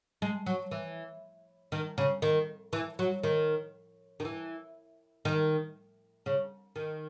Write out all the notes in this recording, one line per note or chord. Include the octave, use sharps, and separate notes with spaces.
G#3
F#3
E3
D#3
C#3
D#3
E3
F#3
D#3
D#3
E3
D#3
C#3
D#3